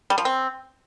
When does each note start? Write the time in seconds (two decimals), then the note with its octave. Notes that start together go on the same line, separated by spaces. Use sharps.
0.10 G3
0.18 F3
0.25 C4